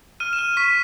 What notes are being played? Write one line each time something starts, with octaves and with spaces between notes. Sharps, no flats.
F6 D#7
E7
F6
C#6 B6